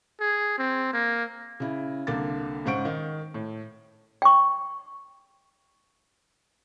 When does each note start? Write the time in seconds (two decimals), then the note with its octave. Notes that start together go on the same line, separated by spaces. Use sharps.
0.20 G#4
0.59 C4
0.93 A#3
1.60 C#3 E4
2.07 C2 D3 A#3 D6 A6
2.66 G#2 C#3 C5 F#5 C#6 D7
2.85 D#3 D#4
3.34 A2
4.22 G5 C#6